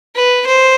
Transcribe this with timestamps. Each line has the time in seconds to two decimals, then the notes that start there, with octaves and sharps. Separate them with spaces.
0.15 B4
0.46 C5